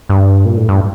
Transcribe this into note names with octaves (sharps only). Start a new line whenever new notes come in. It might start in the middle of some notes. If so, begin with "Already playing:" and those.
G2
A#2
A2
G2